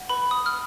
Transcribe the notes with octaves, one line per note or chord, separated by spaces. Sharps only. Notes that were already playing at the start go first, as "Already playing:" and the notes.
Already playing: F#5
B4 B5
D#6
F6